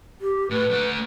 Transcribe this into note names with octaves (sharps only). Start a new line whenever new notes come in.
G4
A2 B4
A3 D5